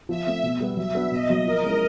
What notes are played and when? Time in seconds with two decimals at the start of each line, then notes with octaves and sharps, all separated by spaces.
0.09 F3 E5
0.26 A3 C4
0.43 B2
0.60 G3 B3
0.77 F#3 E5
0.95 B3 D4 F#4
1.11 B2 D#5
1.29 F#3 A#3
1.46 F3 A#4
1.63 G#3 C#4 E4